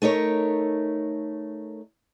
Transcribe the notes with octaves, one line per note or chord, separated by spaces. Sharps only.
A3 D#4 A#4 C#5